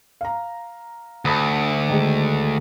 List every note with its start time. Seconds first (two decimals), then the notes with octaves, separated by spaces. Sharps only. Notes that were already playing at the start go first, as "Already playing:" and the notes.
0.21 F5 A#5
1.25 D2 A5 B5 D#6
1.89 D#3 G#3